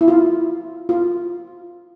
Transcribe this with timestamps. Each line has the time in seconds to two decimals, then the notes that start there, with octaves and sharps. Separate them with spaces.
0.01 E4
0.08 F4
0.89 F4